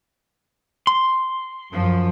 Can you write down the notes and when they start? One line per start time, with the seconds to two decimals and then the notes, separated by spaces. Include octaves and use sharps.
0.87 C6
1.72 F#2 F3